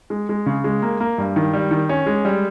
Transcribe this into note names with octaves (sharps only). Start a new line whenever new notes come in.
G#3
G#3
C#3
G#3
A#3
A#3
G2
D#3
G3
D#3
C#4
G#3
G3